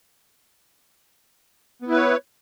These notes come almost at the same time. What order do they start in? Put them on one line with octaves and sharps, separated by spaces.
B3 E4 B4 C#5